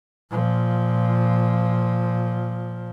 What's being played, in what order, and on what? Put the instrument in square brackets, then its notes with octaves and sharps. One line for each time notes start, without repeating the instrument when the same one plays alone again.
[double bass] A#2 F3